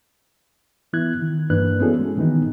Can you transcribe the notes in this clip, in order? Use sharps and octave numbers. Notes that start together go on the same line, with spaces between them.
E3 B3 E4 F#6 G#6
D#3
G2 E3 A#3 D4 B4 F#6
B3 C#4 E4 F#4 G#4 A4
G#3
A#2 D#3 E3 B3 D#4